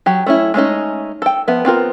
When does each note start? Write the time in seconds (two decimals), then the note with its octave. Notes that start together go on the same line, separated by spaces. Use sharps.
0.06 F#3 G4
0.26 A3 C#4 E4
0.54 G#3 A3 C#4 D#4
1.22 A4 G5
1.48 F3 B3 E5
1.65 B3 C4 F4 A#4